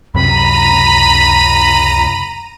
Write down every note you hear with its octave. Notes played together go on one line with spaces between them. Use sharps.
C#2 F#2 C3 A#5 B5 D#7